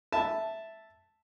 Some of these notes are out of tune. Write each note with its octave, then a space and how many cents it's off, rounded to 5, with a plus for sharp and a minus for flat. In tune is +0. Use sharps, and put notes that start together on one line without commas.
E5 +0 A5 +0